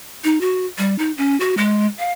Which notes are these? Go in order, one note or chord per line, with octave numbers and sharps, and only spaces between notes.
D#4
F#4
G3
D#4
C#4
F#4
G#3
F5